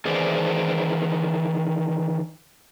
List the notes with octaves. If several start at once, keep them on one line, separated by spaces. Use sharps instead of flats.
D#3 E3 G#4 C5 D5